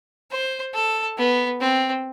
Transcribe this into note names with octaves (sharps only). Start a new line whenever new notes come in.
C5
A4
B3
C4